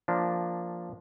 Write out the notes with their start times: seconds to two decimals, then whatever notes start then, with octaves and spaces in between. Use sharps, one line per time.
0.08 F3 A#3 D4